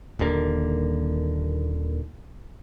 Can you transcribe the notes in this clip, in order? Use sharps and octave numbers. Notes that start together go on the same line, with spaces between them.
D#1 D#2 D3 A#3